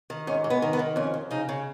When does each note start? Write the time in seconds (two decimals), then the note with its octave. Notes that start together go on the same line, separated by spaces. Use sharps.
0.10 D#3
0.27 G#2 C#4
0.44 G#2
0.50 B3
0.62 D#3
0.73 B3
0.79 D#3
0.96 F2 C#4
1.14 F2
1.31 C#3 D#4
1.49 C#3